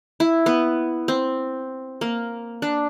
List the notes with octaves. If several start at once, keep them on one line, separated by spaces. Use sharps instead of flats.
E4
B3
C4
A#3
D4